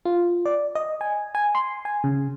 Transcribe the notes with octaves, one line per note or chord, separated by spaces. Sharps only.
F4
D5
D#5
G#5
G#5
C6
G#5
C#3